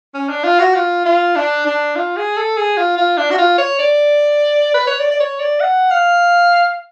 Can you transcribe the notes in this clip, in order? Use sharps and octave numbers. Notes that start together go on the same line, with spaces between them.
C#4
D4
F4
F#4
F4
F4
D4
D4
F4
G#4
A4
G#4
F4
F4
D4
F#4
F4
C#5
D5
B4
C#5
D5
D5
C#5
D5
F#5
F5